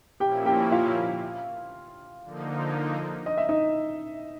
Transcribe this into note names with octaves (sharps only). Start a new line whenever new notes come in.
A#2 F3 A#3 C#4 E4 G4 G5
G4 G5
F4 F5
D3 F3 A#3 D#4
D#5
E5
D#4 D#5